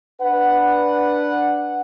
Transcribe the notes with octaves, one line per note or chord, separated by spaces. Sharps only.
D4 B4 F#5